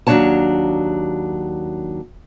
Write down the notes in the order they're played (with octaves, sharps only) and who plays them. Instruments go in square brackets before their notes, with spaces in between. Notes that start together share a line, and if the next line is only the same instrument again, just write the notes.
[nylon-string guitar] D#2 F#3 A3 D4 C#5 A5